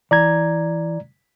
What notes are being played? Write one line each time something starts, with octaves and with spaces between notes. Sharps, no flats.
E3 D5 A#5 G#6